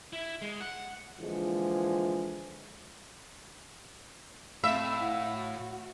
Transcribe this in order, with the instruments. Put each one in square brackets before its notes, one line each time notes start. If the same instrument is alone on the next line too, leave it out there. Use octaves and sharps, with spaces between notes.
[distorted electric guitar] E4
G#3
F#5
[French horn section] A#2 D3 E3 F3 G#3
[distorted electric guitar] A2 [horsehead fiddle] A3 C4 [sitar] E5 [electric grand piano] F5 B5
[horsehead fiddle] E4 F#5
F#4